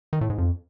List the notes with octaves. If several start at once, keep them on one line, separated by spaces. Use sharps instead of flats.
D#3
A2
G#2
F2